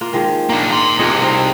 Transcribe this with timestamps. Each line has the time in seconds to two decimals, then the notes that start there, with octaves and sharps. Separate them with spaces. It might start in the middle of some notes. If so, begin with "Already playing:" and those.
0.01 A#3 F4
0.13 D#3 F3 G#3
0.50 A#3 D4
0.71 A#5 C6
0.99 C2 C3 F4 G#4 D#5
1.22 G3 C4 D#4